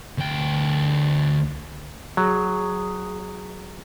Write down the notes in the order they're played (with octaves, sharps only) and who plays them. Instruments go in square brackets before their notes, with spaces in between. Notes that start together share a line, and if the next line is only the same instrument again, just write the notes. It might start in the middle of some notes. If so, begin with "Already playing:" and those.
[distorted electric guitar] D2 G5
[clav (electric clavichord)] F#3 [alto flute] G#4